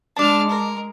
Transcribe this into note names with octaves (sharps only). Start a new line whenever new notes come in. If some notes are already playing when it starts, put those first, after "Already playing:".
G#3 D4 A5 D6 F6
A#4